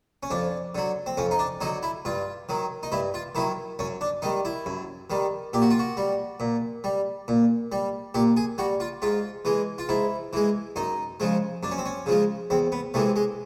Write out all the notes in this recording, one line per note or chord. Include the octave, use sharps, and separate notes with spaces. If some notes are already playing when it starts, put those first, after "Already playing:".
C#4
F2 D4
D3 F#3
C4
F2 C#4
D#4
D4
D3 F#3 D#4
E4
G2 F4
D#3 F#3
D#4
G2 E4
F4
D#3 F#3 E4
F#2 C#4
D4
D#3 G3 D#4
E4
F#2
D#3 G3
A#2 G4
F#4
F4
F#4
G3
A#2
G3
A#2
G3
A#2 G4
G#4
G3 F#4
F4
G#2 F4
E3 G#3
F4
G#2 E4
E3 G#3
F#2 D#4
C#3 F3 G#3
F#2 D4
C#4
C4
C#4
C#3 F3 G#3
E2 C4
B3
C3 E3 G#3 A3
G#3